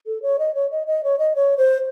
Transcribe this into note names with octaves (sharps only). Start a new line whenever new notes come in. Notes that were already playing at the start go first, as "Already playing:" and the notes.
A4
C#5
D#5
C#5
D#5
D#5
C#5
D#5
C#5
C5